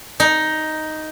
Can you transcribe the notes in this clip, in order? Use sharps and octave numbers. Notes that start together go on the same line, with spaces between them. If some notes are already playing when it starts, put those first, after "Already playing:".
D#4